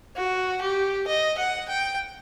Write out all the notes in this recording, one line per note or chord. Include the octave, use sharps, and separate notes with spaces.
F#4
G4
D#5
F#5
G5